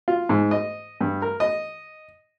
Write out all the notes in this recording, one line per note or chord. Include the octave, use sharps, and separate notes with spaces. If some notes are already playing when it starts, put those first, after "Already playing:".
F4
G#2
D#5
G2
A#4
D#5